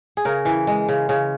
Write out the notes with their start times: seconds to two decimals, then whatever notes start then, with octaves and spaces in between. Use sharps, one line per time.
0.17 G#4
0.25 C#3 A#4
0.45 E3
0.67 G#3
0.89 C#3
1.09 C#3